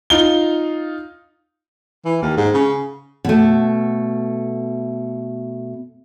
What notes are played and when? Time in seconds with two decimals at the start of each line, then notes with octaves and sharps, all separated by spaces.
0.10 D#4 F4 G7
2.05 E3
2.22 D#2
2.37 G#2
2.54 C#3
3.24 B2 A3